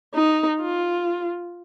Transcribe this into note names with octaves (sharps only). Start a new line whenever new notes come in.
D#4
F4